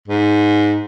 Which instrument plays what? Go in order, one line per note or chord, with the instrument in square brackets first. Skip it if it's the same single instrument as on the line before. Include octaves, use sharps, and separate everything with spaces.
[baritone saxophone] G#2